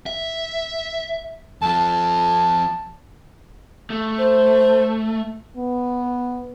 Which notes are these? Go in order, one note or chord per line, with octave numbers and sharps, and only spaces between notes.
E5
F2 F3 A5
A3
C5
B3